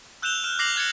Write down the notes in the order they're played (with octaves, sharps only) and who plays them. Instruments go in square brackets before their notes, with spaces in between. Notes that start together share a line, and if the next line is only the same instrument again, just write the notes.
[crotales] E6 F#6 G6 E7 F7 G7
F6 E7
D6 A#6 C7 F7 F#7
F#6 G#6 A6 C#7